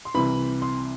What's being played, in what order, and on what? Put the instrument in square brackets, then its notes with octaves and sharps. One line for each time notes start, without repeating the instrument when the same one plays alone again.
[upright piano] C6
C2 C3 E3 B5
C6